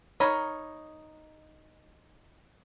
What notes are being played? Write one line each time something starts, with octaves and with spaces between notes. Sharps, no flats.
D#4 A#4 C#5 B5